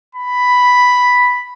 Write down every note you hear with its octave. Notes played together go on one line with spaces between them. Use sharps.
B5